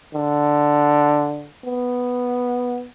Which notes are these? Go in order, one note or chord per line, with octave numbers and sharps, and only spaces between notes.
D3
B3